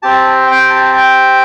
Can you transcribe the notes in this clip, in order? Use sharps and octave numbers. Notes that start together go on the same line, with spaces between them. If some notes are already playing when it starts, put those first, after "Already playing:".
C4 G4 A5
G5
A5
A5
G5